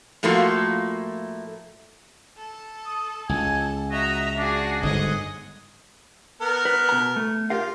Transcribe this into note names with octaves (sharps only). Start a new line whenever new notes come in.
A2 F3 A3 A#3 F4 F#4
A4
D#6
C#2 A4 G#5
F#4 D#5 E5 A#5
D4 F#4 G#4
G1 G#2 G#3 G#4 D#5 F#5
B3 A#4
B4
B2 A#5
A3
F4 G4 A#4 F5